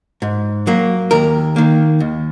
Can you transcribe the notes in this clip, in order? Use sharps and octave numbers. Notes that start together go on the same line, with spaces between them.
G#2
F#3 A#3
D#2 A#4
D#3 A#3
D#2